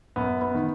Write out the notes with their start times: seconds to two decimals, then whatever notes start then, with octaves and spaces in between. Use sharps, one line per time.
0.16 F#2 B3
0.42 B3
0.54 D#3